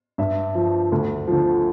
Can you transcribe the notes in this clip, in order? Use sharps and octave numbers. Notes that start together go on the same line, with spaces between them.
G2 E5
F3
D2
D3 F3